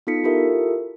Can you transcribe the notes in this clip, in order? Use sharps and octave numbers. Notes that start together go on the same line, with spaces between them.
B3 D#4 F4 A4 B6 C#7
E4 F4 G4 A4 A#4 E5